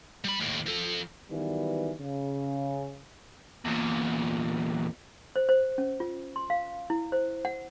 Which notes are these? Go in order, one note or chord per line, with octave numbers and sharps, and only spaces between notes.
G3 B5
D#2 A2
F3 A4
D#3 E3 F#3 G3 B3
C#3
E2 A#2
C5
C5
C#4
F4
C6
F5
E4
C5
F#5